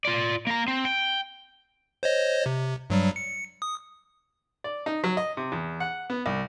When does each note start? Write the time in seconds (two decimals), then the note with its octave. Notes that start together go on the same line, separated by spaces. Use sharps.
0.05 F4 D5
0.47 A#3 A#5
0.68 C4
0.85 G5
2.03 C5 C#5 D#5
2.46 C3
2.90 G2 F#3 G3
3.16 C#7
3.62 D#6
4.64 D5
4.86 D#4
5.04 F#3
5.17 D#5
5.37 C3
5.52 E2
5.80 F#5
6.10 B3
6.26 C2